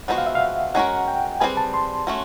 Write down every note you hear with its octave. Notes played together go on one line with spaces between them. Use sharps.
F3 G#3 B3 D#4 F#4 F#5
F5
E5
F5
G#3 C#4 F#4 A#4 F#5
G5
G3 C4 F4 G#4 B4 G#5
A5
C6
A3 C#4 F#4